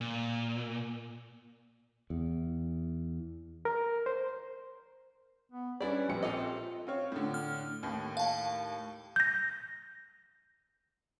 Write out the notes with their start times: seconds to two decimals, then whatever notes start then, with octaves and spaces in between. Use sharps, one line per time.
0.01 A#2
2.10 E2
3.65 A#4
4.06 C5
5.52 B3
5.80 G3 C#4 D4 E4 B4 D5
6.09 A#1 C4 G4 C#7
6.23 F4 A4 D#5 G5
6.87 C4 F4 C#5
7.12 A2 D3
7.34 F6
7.83 D#2 A2
8.17 F5 A5
9.16 G6 A#6